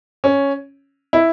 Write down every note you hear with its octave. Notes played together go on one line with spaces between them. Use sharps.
C#4
E4